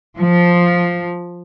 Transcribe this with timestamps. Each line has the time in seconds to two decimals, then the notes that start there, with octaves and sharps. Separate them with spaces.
0.16 F3